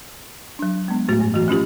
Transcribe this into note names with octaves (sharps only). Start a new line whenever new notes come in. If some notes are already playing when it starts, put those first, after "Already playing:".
F#3 D4
G#3 B3
A2 A3 F#4
G2
E3 F#4
F3 C#4 F4 G4